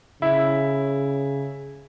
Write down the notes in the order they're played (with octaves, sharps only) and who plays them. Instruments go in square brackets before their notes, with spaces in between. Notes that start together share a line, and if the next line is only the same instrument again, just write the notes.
[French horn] C#3 [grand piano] E4